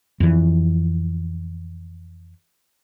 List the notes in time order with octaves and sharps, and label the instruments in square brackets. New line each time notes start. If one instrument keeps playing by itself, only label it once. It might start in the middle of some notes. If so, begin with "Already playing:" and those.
[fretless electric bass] F2 E3